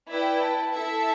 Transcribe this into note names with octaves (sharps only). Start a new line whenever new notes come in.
E4 B4 D5 G5
A5
E4 A4 E5